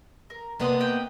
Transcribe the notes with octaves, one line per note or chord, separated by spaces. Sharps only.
A#4
C3 A#3 B3 D4 D#5 C6
D#5 G5